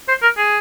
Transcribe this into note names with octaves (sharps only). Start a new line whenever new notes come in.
C5
A#4
G#4